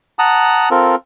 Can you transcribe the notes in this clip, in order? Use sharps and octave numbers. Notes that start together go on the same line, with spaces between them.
F#5 A5 A#5 D#6
C4 F4 A4 A#4